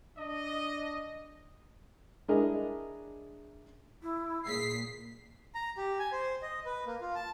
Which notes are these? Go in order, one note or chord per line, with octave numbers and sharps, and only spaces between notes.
D4 D#5
G#3 D4 E4 G#4 A#4 D#5
E4
A#2 G#4 B6 C7
A#5
G4
G#5
C5
D#5
B4
A#3
F4
A5